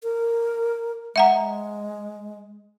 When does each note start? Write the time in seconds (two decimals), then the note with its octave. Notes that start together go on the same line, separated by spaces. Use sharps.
0.03 A#4
1.16 G#3 E5 F#5 A#5